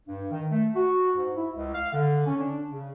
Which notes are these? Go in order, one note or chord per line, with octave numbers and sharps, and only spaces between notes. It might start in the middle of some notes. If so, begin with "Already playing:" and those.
G2
D#3
A3
F#4
G#2
E4
C#2
F5
D3
C#4
D4
C#3